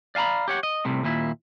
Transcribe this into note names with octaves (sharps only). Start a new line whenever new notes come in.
D5 F5 G#5 A#5 B5
G4 C#5 F#5
D#5
C2 A2 C3
D#2 A#2 E4